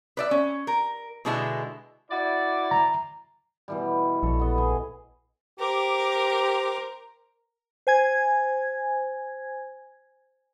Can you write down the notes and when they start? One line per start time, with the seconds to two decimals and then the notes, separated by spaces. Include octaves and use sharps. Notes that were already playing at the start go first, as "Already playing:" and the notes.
0.17 B4 D5 E5
0.31 C#4
0.67 A#4
1.25 B2 D3 G#3 B3 E4
2.11 E4 F#4 D5
2.71 A#5
3.68 B2 E3 G3
4.23 A#1 A4 C#5
4.40 B3 D#5
4.58 G#4 G#5
5.60 G4 A#4 C5 D6
7.87 C5 G#5 G#6